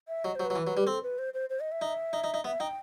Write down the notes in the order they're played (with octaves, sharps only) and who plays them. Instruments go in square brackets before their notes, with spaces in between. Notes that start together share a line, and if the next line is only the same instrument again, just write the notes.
[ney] E5
[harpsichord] F#3 [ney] D#5
[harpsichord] F#3 [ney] C5
[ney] B4
[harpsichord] F#3
E3
F#3
G3
[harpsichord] C4 [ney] A4
[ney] B4
C5
C5
C5
D#5
E5
[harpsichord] D#4
D#4
D#4
D#4
[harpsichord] B3 [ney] E5
[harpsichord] D#4 [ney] G5